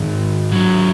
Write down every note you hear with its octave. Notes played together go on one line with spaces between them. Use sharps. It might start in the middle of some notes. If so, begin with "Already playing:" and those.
Already playing: G#2 D#3
F#3